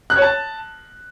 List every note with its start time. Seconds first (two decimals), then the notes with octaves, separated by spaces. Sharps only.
0.10 F#6
0.16 C#5
0.22 A5